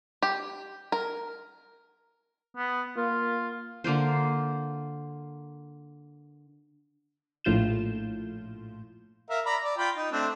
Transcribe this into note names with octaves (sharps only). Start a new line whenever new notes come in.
G4
A#4
B3
A#3 F4
D3 A#3 F4 C5
A#1 A2 F4 G6 E7
A#4 E5 F5
D5 A#5 B5
D5
F4 G5 B5
D#4
A3 C4 D4